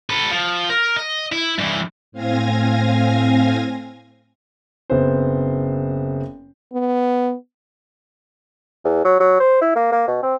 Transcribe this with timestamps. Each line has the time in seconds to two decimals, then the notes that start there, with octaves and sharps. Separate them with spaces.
0.10 A4 B4
0.31 F3
0.70 A#4
0.97 D#5
1.32 E4
1.59 G2 E3
2.12 A2 C4 F5 G#5 G#6 A#6
4.90 F#1 B3 C4 C5
6.73 B3
8.85 E2
9.05 F#3
9.20 F#3
9.40 C5
9.61 E4
9.76 A#3
9.92 A#3
10.08 B2
10.22 C4